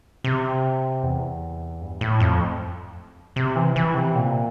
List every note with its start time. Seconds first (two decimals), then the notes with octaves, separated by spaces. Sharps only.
0.24 C3
1.03 E2
1.82 G2
2.01 A2
2.20 F2
3.36 C3
3.56 E3
3.76 E3
3.95 C3
4.15 A#2